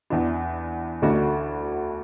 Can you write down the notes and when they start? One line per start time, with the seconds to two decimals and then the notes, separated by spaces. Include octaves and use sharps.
0.10 E2 E3 D4
1.02 D2 D3 A3 D4 F#4